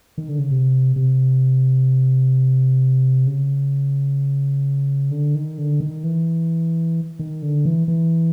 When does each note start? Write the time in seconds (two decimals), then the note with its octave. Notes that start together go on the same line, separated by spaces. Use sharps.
0.18 D#3
0.29 D3
0.39 C#3
0.50 C3
0.96 C3
3.27 C#3
5.11 D3
5.35 D#3
5.58 D3
5.80 D#3
6.04 E3
7.19 D#3
7.42 D3
7.65 E3
7.88 E3